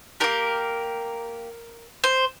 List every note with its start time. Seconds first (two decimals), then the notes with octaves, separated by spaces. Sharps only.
0.20 A#3 D4 G4 A#4
2.04 C5